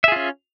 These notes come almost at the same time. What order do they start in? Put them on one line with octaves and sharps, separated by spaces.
E5 G#4 F4 C#4